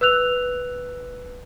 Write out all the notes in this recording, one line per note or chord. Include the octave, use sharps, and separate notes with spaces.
B4 E6 F#6 F7